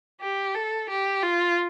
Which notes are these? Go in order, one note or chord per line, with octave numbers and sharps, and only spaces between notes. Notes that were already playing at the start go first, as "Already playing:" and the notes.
G4
A4
G4
F4